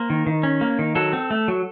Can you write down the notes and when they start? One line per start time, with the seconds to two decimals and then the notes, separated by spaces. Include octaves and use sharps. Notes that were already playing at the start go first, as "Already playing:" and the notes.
Already playing: A#3 C5
0.10 D#3
0.27 D#3
0.43 C#4
0.61 A#3
0.79 D#3
0.95 F#3 A4
1.13 C4
1.31 A3
1.48 F#3